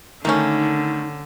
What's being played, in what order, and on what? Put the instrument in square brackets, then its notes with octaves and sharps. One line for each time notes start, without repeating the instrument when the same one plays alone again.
[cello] D3 [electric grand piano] D#3 A3 [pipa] A#3 C#4 [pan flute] D#4